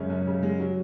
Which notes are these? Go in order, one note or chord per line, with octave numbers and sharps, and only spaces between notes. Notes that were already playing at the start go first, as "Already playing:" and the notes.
Already playing: F#2 C#3 G#3 C#4
F#2
C#3
G#3
F#3